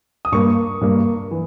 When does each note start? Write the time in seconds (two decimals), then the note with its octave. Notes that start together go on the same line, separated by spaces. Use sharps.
0.25 D#6
0.32 G2 G3 A#3 C#6
0.81 G2 G3 A#3
1.31 E3